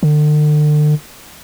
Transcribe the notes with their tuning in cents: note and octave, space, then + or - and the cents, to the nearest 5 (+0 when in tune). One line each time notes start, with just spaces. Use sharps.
D3 +40